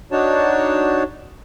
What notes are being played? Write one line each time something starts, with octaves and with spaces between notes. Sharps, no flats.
D4 D#4 F#4 C#5 A5